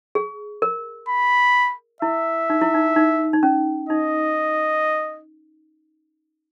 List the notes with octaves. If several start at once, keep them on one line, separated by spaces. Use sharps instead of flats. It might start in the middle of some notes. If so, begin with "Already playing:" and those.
G#4
A#4
B5
E4 E5
D#4
E4
D#4
D#4
D#4
C#4
D#4 D#5